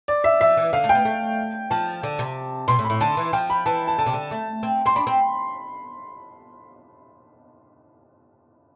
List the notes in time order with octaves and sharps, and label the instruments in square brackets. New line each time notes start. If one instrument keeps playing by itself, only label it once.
[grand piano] D5
E5
[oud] F3 [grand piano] E5
[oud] E3
[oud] D3 [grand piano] F5
[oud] A3
[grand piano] G5
[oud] B3
A3
[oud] F3 [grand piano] A5
[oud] D3
C3
[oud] B2 [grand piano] C6
[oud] A2
[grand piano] B5
[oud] A2
[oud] D3 [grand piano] A5
[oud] E3
[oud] F3 [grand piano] G5
[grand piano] B5
[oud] E3 [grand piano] A5
[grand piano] A5
[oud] D3 [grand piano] A5
[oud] C3
D3
A3
C4
[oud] C4 [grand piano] C6
[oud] D4 [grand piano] B5
[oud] C4